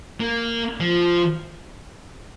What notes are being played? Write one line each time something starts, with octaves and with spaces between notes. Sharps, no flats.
A#3
F3